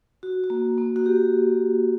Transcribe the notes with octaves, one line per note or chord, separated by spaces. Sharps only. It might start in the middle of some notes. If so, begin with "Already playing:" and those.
F#4
F#4
A#3
A#3
F#4
A#3 G4